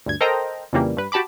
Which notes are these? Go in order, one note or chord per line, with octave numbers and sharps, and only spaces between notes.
D2 G2 G#6
A4 A#4 C5 D#5 G5 A#5
F2 C#3 E3 G3 A#3
G2 B4
F#4 G4 A5 B5 D6